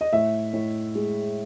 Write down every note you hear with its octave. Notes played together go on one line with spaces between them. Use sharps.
D#5
A2 E5
A2
G#3